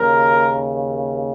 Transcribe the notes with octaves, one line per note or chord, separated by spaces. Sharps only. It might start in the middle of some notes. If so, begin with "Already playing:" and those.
Already playing: D#2 C#3 A#4